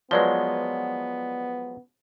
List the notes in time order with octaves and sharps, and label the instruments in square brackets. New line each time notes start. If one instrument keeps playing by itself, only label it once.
[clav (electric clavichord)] F3 F#3 G#3 [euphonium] B3 [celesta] B4 D5 G7